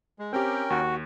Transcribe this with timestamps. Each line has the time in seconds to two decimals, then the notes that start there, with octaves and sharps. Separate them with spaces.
0.19 G#3
0.33 C4 C#4 G4 A#4 G5
0.70 D#2 F#4